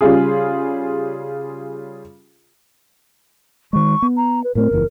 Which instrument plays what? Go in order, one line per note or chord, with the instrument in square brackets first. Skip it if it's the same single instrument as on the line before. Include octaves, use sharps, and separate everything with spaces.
[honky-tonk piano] C#3 G3 F4 G#4
[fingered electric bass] D#3 G#3 [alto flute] C#6
[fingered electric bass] B3
[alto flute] A#5
B4
[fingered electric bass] A2 A3 C4 [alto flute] A#4
[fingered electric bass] F#1 E2 B3